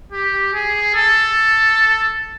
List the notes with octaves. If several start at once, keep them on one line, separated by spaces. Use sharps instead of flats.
G4
G#4
A4